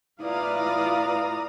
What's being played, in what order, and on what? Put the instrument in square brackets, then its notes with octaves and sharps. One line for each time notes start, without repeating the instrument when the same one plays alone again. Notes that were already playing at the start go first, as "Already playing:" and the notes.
[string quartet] A2 A#5 D#6 [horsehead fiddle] E4 F4 [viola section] B4 D5 F5